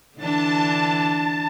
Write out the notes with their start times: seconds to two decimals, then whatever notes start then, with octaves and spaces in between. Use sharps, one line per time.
0.18 D3 E3 D4 A5